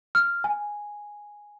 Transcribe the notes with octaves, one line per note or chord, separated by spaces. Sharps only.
F6
G#5